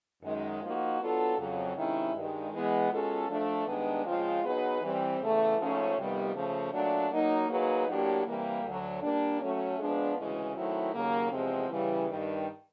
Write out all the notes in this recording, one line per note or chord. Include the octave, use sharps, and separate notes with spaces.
F#2 D#3 G#3
F3 A#3 D#4 F#4
F#3 B3 D4 F4 A4
F2 C#3 F#3
C3 D#3 G#3 C#4 E4
G2 D#3 G#3
E3 G#3 B3
B2 G#3 C#4 F4 A4
F3 A3 D4
G2 D#3 G#3 B3 D4
C#3 F3 G#3 C4 F4
F#3 B3 D#4 G#4 B4
E3 G3 C4
E2 C#3 E3 A3
G#2 F3 A3 C#4 F4
F2 C3 D#3 G3 B3
C#3 F3 A3
A#2 F#3 A3 D4
F#3 A#3 D#4
F#3 A#3 D#4 G#4 B4
A2 F#3 A#3 D4 G4
C3 E3 G3 A#3
D2 D3 F#3
A#2 G3 A#3 D4
F#3 A3 C#4
F3 G#3 B3 D4
D2 C#3 E3 G#3
D#3 F#3 A3 C4 E4
D#2 C#3 F#3 A#3
E2 C3 F3 G#3 C4
C#3 E3 G3
G2 D#3 G3